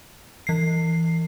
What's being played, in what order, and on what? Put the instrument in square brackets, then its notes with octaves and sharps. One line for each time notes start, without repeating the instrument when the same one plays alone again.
[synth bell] E3 C7